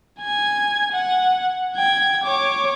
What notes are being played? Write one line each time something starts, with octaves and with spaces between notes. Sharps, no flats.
G#5 G#6
F#5
G5 G#6
C#5 D6